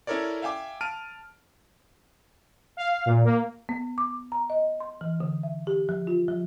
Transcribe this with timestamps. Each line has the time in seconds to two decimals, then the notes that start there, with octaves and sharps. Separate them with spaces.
0.07 C#4 E4 A4 A#4 C#5 D5
0.42 E5 F5 G5 G#5 D6
0.81 A5 F6 D7 D#7
2.77 F5
3.06 A#2
3.24 A#3
3.69 B3
3.98 D6
4.32 A#5
4.50 D#5
4.80 C6
5.01 E3
5.20 D3
5.43 E5
5.67 G4
5.89 F3
6.07 F4
6.28 F3